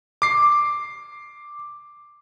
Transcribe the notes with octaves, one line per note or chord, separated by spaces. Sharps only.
D6 C7